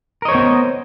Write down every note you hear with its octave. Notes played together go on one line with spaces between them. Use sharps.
B3 A#4 C5 C#5 D#5